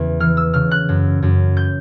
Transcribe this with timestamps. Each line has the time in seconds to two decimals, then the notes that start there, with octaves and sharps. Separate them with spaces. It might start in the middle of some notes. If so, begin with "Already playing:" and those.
Already playing: E2 C#3
0.20 E3 F6
0.37 E6
0.54 C#3 F6
0.71 F#6
0.89 F#2
1.22 F#2
1.57 G6